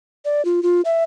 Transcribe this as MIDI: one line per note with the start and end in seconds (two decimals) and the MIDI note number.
0.25 0.44 74
0.45 0.63 65
0.63 0.81 65
0.85 1.03 76